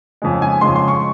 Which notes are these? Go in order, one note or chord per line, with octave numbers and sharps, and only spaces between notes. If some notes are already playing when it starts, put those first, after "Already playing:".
F2 C#3 G#3
G#5
F2 C#3 G#3 C6
C6
C#6